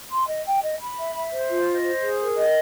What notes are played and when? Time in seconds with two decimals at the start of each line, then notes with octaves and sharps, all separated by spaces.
0.11 C6
0.28 D#5
0.45 G5
0.63 D#5
0.80 B5
0.97 E5
1.15 E5
1.32 C5
1.49 F4
1.67 D#5
1.84 C5
2.02 G#4
2.19 A#4
2.36 D#5